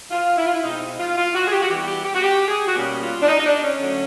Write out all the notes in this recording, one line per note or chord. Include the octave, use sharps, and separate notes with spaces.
F4
E4
F4
E4
B2 G#3 C4 D#4
F4
F4
F#4
G#4
G4
F#4
E3 G3 B3 G4
G4
G4
F#4
G4
G#4
F#4
B2 G3 A#3 C#4 G4
F4
D4
D#4
D#4
D4
C#4
D3 F#3 A3